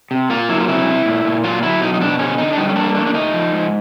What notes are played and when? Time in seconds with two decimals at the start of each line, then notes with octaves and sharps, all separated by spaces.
0.11 C3
0.30 A#3 F4
0.49 F#3 E4
0.60 F4
0.68 C3 E4
0.87 C3
1.06 A#2
1.25 A#2
1.44 F#3 F4
1.63 F#3 E4
1.81 B2 D#4
1.94 D#4
2.01 B2 D4
2.19 D3 C#4
2.38 D3 D#4
2.53 D4
2.57 G3 D#4
2.69 C#4
2.76 A#3 D4
2.95 A3 D4
3.06 D4
3.14 A3 D#4
3.33 F3
3.52 G#2